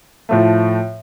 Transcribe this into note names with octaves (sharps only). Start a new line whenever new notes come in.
A2 F3 A3